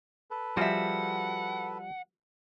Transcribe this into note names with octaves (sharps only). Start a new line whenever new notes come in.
A4 B4
F3 G3 F4 F#4 G#4 E5 F#5